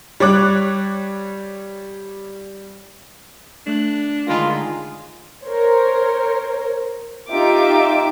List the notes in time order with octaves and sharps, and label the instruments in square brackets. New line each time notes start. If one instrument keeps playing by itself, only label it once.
[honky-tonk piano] G3 C#5 D6 F#6
[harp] A3 F#6 [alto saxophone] D4
[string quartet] D3 D#3 G#3 [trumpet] F4 [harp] A#4 B5
[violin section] A#4 C5 C#5
D#4 F4 G4 E5 D6